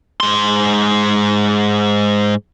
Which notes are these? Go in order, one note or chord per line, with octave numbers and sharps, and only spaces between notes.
G#2 C6